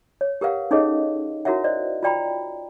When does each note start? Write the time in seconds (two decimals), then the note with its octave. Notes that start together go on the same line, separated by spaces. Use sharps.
0.21 C#5
0.41 G4 A#4 B4 F5 F#5
0.71 C#4 D#4 G#4 A4 C#5 D#5
1.45 E4 F#4 A#4 C#5 E5 F#5
1.64 C5 D5 D#5
2.03 F4 F#4 D5 G5 A#5 B5